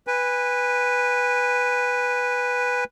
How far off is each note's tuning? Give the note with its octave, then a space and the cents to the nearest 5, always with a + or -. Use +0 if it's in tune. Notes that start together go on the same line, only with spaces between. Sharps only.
B4 +0 G#5 -30